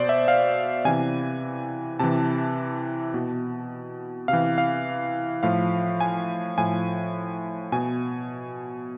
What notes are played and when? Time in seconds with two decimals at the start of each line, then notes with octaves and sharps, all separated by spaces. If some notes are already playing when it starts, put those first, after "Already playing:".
Already playing: B2 C5 D5
0.09 E5
0.28 F5
0.85 C3 E3 G#5
1.99 C3 E3 A5
3.14 B2
4.28 C3 E3 F5
4.58 F5
5.43 A2 F3 F5
6.00 G#5
6.58 A2 F3 G#5
7.72 B2 G#5